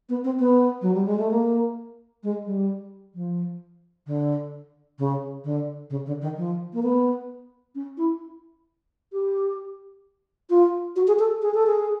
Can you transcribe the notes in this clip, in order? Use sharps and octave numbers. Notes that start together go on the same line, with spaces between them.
B3
C4
B3
F#3
G3
G#3
A3
A#3
G#3
G3
F3
D3
C#3
D3
C#3
D3
D#3
F3
A#3
B3
C#4
E4
G4
F4
F#4
G#4
A4
G#4
A4
G#4